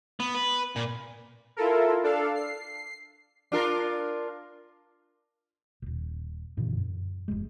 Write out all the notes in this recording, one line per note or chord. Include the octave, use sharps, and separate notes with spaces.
B3
B4
A#2
E4 F4 A4 A#4
D4 A4 F5
C7
D4 F4 A#4
D#1 G#1
F#2 A#2 D3 E3
F#2
F1 D#2 G#3